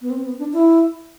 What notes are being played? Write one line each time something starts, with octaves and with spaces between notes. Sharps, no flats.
B3
C4
B3
D4
E4